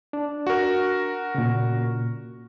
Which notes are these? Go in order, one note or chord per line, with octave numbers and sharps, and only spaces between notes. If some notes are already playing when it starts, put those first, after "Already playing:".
D4
F#4 A#4
A#2 C#3